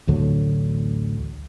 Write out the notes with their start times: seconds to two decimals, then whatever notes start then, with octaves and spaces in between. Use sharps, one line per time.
0.07 A1 D2 D3 F#3